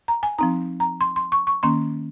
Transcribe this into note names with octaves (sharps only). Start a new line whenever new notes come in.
A#5
G#5
F3 C4 D#4 A#5
A#5
C6
C6
C#6
C#6
D#3 A#3 C#4 C6